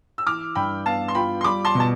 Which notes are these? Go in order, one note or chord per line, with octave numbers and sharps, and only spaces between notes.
E6
E3 D6 F6
G2 G5 B5
B3 F5 A5
C6
F4 G5 B5
C6
G3 B5 D6
A5 C6
B2
A5